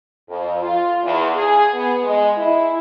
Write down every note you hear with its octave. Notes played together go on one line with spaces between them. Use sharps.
F2
F4
E2
G#4
B3
G#3
E4